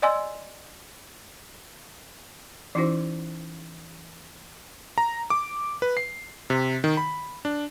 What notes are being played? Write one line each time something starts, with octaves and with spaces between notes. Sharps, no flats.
D5 D#5 G#5 C6 E6
E3 C#4 D#4 E4 F#4 C5
A#5
D6
B4
C7
C3
D#3
B5
D4